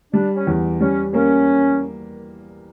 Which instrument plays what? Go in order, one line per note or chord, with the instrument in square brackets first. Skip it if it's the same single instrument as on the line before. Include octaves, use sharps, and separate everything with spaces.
[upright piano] G3 [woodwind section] D4
[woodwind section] C#4
[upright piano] E2
[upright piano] G3 [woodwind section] C#4
[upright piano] A#3 [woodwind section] C#4